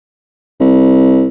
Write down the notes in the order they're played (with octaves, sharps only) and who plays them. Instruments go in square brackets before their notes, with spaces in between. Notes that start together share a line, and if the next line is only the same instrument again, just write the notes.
[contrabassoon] C2